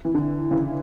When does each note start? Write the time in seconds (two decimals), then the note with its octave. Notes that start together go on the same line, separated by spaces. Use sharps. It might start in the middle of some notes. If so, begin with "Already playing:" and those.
0.05 E3
0.15 D3
0.51 C#3 E3